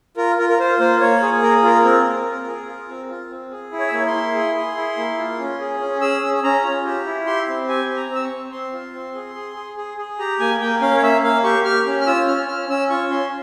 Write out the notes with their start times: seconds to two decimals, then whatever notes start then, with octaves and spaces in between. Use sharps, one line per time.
0.17 F4 A#4
0.38 F4 A#4
0.49 A#4
0.59 F4 C5
0.80 A#3 C5
1.01 A#3 C#5
1.22 G#4
1.42 A#3 A#4
1.63 F4 A#4
1.84 C4 A#4
2.05 C4
2.26 F4
2.47 G#4
2.68 F4
2.89 C4
3.09 F4
3.30 C4
3.51 G#4
3.72 E4
3.79 C#5
3.87 E5
3.92 A#3 C#5
4.07 C6
4.13 E4
4.34 G#4
4.55 G#4
4.76 E4
4.97 A#3
5.18 F4
5.39 C#4
5.60 G#4
5.80 C#4
6.01 G#4 E6
6.22 C#4
6.44 C#4 A#5
6.64 F4
6.85 G4
7.06 E4
7.27 G4 C6
7.48 C4
7.69 G4 G#5
7.89 C4
7.96 A#5
8.10 C4
8.15 E6
8.24 C#6
8.31 C4
8.52 C4 C6
8.73 F4
8.94 C4
9.14 G#4
9.35 G#4
9.56 G#4
9.77 G#4
9.97 G#4
10.19 G4 A#5
10.40 A#3 G#5
10.60 A#3 G5
10.81 C#4 F5
10.97 C#5
11.02 A#3 E5
11.23 A#3 F5
11.44 G4 C#6
11.65 G4 F6
11.86 C#4
12.01 F6
12.06 F4 E6
12.27 C#4 F6
12.48 C#4 F6
12.69 C#4 E6
12.90 F4 C#6
13.11 C#4 C6